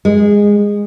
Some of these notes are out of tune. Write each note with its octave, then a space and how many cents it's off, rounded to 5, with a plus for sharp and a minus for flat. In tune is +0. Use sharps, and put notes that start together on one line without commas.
G#3 -15